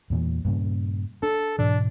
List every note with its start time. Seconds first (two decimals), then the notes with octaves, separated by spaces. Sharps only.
0.10 E2 A#2 E3
0.45 G2 A#2 C#3
1.23 D4 A4
1.59 G#2 B2 E3 D4